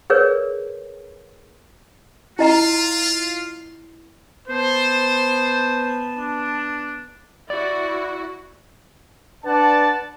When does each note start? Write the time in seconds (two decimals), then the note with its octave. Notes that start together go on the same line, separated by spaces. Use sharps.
0.10 G#4 A#4 B4 C#5 D5
2.39 E4 F4 D#5 A#5
4.48 B3 C5 A5
6.17 D4
7.50 E4 F#4 D5
9.45 D4 B4 D5 F#5 A5